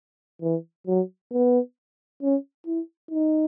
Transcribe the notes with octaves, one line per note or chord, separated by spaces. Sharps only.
E3
F#3
B3
C#4
E4
D#4